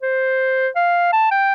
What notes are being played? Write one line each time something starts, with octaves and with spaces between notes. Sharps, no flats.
C5
F5
A5
G5